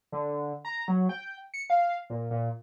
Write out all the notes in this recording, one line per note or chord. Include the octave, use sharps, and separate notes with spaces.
D3
A#5
F#3
G5
C#7
F5
A#2
A#2